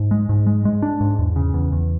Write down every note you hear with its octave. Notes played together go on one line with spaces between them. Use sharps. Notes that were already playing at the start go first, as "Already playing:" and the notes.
Already playing: G#2
G#3
G#2
G#3
G#3
D4
G#2
E2
C#3
E2
E2